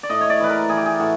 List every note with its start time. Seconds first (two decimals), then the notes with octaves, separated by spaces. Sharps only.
0.03 D5
0.10 A2 D#5
0.21 C#5
0.30 D5
0.40 E3 B4
0.49 A#4
0.69 E3 G#4
0.77 G4
0.86 G#4
1.00 A2 F#4